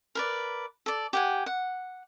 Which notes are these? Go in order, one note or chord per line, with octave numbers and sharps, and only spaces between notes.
A#4 B4 D5
A4 D5
G4 F#5 G#5
F#5